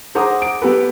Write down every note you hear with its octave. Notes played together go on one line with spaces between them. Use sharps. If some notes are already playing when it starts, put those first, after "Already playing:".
G#4 C5 F#5 A#5 D6 D#6
D7
B3 G4 A4 B4